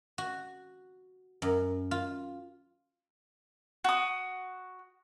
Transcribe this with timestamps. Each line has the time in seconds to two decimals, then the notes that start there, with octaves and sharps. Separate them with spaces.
0.18 F#4
1.42 F#2
1.91 F4
3.84 F#4 D#6